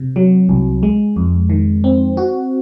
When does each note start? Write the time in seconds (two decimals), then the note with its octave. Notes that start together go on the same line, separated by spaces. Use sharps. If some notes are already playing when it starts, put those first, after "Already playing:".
Already playing: C3
0.16 F#3
0.49 C2
0.83 G#3
1.16 F2
1.50 D#3
1.84 C4
2.17 F#4